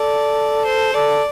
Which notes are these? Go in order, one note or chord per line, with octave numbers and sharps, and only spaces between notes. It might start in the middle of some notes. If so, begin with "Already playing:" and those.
Already playing: A4 D5
C5
A4 D5